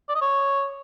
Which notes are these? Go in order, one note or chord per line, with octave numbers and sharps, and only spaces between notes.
D5
D#5
C#5